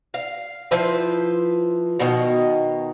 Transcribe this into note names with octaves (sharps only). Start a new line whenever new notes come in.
F5
F3 E4 B4 C5
B2 D#3 D#5